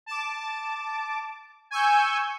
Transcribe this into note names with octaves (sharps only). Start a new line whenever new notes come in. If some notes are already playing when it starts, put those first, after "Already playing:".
A5 D6
G#5 C#6 E6 G6